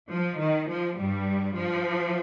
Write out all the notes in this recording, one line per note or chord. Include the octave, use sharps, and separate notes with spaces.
F3
D#3
F3
G2 G3
F3